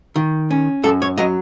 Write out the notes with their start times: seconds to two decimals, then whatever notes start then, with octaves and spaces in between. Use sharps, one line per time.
0.16 D#3
0.51 C#4
0.83 F#2 A4
1.02 C#5
1.18 F#3 D#5